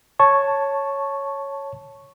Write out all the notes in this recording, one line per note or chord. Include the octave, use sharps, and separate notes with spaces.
C#5 A5 C#6